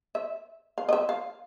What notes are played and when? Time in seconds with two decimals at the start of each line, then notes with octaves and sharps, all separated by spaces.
0.15 E5
0.78 F5
0.89 D#5
0.93 E5
1.09 F5